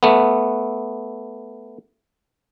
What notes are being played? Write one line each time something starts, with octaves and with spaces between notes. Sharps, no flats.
A3 B3